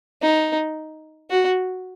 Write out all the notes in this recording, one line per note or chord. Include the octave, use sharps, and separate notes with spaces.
D#4
F#4